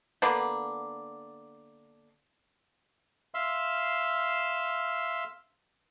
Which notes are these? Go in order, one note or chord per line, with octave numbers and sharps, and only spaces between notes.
D3 A#3 B3 D4
E5 F5 C6 E6